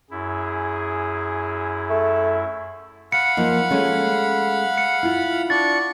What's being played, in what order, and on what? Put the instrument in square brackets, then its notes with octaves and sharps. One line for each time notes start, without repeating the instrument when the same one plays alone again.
[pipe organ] F#2 E4 [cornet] G#4
[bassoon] A3
[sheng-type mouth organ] F5 F#5 B5 [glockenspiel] C#7
[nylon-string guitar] F3 A#3 D#4
G#3 A3 C#4
[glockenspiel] C#7
[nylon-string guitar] E4 F4
[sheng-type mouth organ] D4 C#6 [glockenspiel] A6